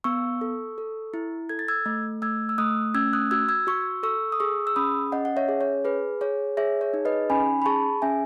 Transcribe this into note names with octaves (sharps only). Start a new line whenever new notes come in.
B3 C#6 E6
A4
A4
E4
A4 G#6
A6
E6 G#6
A3
A3 E6 G#6
E6
A3 D#6 F#6
C#4 E6 G#6
D#6 F#6
F#4 E6 G#6
E6 G#6
F#4 C#6 E6
A4 C#6 E6
D#6
G#4 C#6 E6
E6
C#4 B5 D#6
C#4 D#5 F#5
F#5
C#5 E5
G#4
C#5
G#4 B4
G#4 C#5
G#4 C#5 E5
C#5
D#4
B4 D#5
C#4 G#5 B5
B5
G#4 A5 C#6
C#4 E5 G#5